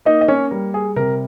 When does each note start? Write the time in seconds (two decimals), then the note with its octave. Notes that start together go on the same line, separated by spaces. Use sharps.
0.05 A#3 D#4 D#5
0.21 D#5
0.28 C#4 C#5
0.51 G3 A#4
0.74 G#4
0.96 C3 A#4